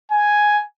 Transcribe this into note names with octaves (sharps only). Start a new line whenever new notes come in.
G#5